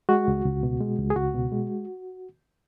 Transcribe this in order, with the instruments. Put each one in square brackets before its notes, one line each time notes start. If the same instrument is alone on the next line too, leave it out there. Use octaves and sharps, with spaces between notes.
[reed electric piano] G#3 F#4
C#2
C#2
B2
G#3
C#2
G#4
C#2 F#4
B2
G#3